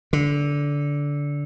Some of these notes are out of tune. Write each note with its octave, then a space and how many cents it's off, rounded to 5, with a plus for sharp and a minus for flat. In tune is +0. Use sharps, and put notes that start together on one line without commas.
D3 -20